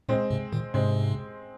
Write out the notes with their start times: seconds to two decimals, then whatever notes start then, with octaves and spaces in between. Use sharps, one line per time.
0.09 A#2 G#3 C4
0.30 G#2 C3
0.52 A#2 D#3
0.74 G#2 C3 G#3 C4